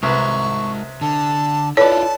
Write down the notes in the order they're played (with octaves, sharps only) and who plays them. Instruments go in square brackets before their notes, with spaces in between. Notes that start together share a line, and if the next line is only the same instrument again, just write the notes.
[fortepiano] C2 B4 [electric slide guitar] G#3 A#4 A#5 [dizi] C#6
[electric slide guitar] D3 [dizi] A5
[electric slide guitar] E4 F4 [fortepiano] A4 B4 D5 [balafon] C#5 [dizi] A5